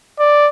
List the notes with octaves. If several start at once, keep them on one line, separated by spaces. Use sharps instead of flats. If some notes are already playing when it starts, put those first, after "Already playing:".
D5